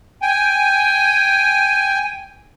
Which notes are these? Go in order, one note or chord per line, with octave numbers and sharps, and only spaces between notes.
G5 G#5